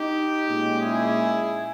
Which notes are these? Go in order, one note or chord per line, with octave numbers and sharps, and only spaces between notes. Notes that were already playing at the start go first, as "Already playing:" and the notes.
Already playing: D#4 G4
A#2 G#3 C#4
E4 G#4